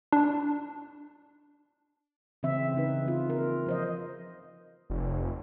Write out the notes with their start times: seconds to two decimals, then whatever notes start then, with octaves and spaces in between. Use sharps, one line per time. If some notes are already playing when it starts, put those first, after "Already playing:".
0.12 D4
2.43 C#3 E3 C4 E5
2.74 C#3 E3 D#4 B4
3.07 C4 F4
3.30 A#4
3.66 F3 C5 D#5
4.90 F1